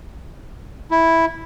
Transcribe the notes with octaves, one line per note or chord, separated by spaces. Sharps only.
E4